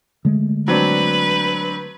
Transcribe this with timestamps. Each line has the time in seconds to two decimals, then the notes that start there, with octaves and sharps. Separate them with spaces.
0.25 D3 G#3 A3
0.68 F#3 C4 D4 B4